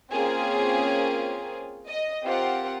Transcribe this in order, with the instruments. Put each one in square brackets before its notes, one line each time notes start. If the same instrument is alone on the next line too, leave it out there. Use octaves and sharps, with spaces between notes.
[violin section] A#3 C4 C#4 F4 G#4
D#5
C4 F4 G4 A#4 F#5